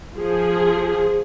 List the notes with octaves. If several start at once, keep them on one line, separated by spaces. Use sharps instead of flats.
F3 G#4